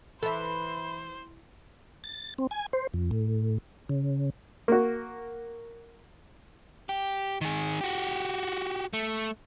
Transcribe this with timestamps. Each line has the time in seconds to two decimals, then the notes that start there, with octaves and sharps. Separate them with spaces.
0.23 E3 A4 C5 E5 B5
2.04 A6
2.38 C4
2.51 G#5
2.73 C5
2.94 F2
3.11 A2
3.89 C#3
4.68 A#3 F#4
6.89 G4
7.41 D#3 G#4
7.81 F#4 G4
8.93 A3